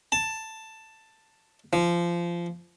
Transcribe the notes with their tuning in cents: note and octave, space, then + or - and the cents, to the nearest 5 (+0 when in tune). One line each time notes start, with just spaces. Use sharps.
A5 +10
F3 -20